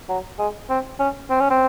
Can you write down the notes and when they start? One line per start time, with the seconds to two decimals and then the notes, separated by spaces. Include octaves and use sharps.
0.09 F#3
0.39 G#3
0.69 C4
0.99 C#4
1.30 C4
1.40 C#4
1.50 C4